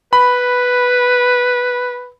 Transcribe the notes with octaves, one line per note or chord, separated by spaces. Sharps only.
B4 B5